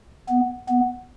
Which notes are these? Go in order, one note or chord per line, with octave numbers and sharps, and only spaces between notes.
B3
B3